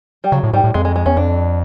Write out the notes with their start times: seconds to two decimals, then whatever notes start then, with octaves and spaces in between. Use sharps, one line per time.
0.24 G3
0.32 C#3 F#3
0.43 A2
0.53 G#2 G3
0.64 A2
0.74 F2 G#3
0.85 G#3
0.96 G#3
1.06 E2 C#4
1.17 F2 D4